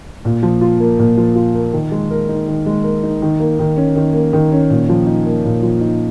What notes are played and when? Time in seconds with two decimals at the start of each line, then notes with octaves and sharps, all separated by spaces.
0.25 A#2
0.43 F3
0.61 F4
0.80 A#3
0.99 A#2
1.17 F3
1.35 F4
1.55 A#3
1.73 D#3
1.92 G#3
2.11 A#4
2.29 D#4
2.48 D#3
2.66 G#3
2.84 A#4
3.03 D#4
3.22 D#3
3.39 A#3
3.59 D#3
3.77 C#4
3.96 D#3
4.14 A#3
4.33 D#3
4.52 C#4
4.70 A#2
4.89 F3
5.07 D#4
5.26 A#3
5.45 A#2
5.63 F3
5.81 D#4